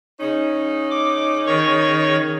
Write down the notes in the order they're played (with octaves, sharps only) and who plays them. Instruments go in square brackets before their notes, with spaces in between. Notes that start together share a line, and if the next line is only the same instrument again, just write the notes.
[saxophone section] C#3 C#4 D#4
[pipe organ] D6
D#3 C#5 C#6